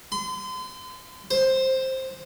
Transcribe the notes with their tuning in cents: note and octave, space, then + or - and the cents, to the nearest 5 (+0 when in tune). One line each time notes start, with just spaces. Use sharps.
C6 -40
C5 +10